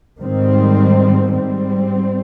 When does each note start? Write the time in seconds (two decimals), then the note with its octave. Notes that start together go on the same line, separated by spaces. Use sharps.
0.21 G#2 D#3 G3 C4
1.34 G#2 G3 C4